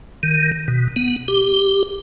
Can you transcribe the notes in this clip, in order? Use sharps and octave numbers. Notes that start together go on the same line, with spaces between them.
D#3
B2
B3
G4